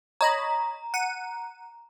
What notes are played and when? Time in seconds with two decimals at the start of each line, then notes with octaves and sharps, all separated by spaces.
0.21 C#5 D#5 A#5 B5
0.94 F#5 D#7